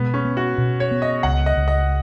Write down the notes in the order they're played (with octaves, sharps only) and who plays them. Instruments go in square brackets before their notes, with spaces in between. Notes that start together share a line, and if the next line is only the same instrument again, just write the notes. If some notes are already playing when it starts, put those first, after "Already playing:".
Already playing: [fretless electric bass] B2 G#3 [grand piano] B3
[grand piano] C#4
[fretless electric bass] B3
[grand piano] F#4
[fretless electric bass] B2
[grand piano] C#5
[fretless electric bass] B3
[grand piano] D#5
[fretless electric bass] C#2 [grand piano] F#5
[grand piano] D#5
[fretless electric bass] C#2
[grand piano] D#5